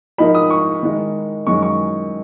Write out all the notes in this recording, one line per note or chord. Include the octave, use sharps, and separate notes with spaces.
G#2 F3 A#3 D#4 B5
D#6
C#6
D#3 G#3 D#4
F#2 D#3 G#3 C#6
C#6